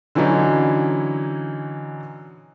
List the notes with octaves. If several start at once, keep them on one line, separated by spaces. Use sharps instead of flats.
D3 E3 F#3 C#4 D#4 E4